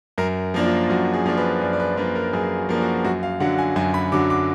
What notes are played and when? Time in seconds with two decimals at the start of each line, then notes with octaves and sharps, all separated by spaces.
0.18 F#2 A#4
0.54 F3 A#3 D4
0.66 F4
0.90 F#2 F#4
1.13 G#4
1.26 F3 A#3 D4
1.38 B4
1.61 F#2 D5
1.73 D5
1.80 B4
1.97 F3 A#3 D4 B4
2.15 A#4
2.33 F#2 G#4
2.57 F#4
2.69 F3 A#3 D4
2.81 F#4
3.04 F#2 F#4
3.23 F5
3.40 D3 F#3 F#5
3.59 G#5
3.76 F#2 G#5
3.94 B5
4.12 D3 F#3 D6
4.30 D6